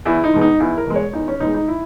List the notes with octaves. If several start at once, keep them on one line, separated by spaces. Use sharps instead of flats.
E2 E4
D#4
B2 G#3
D#4
E2 E4
A#4
B2 G#3
C#5
E2 D#4
C#4
B2 G#3 D#4
D#4
E4